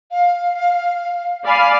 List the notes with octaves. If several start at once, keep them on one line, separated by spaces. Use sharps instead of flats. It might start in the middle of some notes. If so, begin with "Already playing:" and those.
F5
D5 F5 G#5 B5